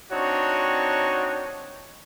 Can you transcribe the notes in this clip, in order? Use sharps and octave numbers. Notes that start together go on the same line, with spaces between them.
C4 D4 D#4 F#4 C#5